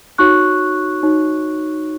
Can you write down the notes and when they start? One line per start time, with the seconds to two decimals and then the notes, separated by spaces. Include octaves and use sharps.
0.18 D#4 F#4 C#5 C#6 F#6
1.03 D#4 F#4 C#5